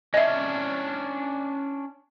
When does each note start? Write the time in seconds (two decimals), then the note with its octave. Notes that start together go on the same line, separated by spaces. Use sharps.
0.14 C#4 D4 D#5 E5